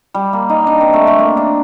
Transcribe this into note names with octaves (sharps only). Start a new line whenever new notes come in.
G3
A#3
D#4
D4
C4
A3
A3
A#3
D4